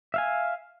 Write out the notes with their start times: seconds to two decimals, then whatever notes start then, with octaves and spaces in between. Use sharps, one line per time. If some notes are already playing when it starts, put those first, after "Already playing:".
0.14 E5 F5 G#5